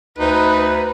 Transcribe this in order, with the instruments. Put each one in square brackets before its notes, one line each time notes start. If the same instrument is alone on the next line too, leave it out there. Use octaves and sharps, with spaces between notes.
[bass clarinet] D2 [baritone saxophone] D#4 [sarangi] B4